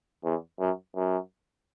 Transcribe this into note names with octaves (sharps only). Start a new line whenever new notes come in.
E2
F#2
F#2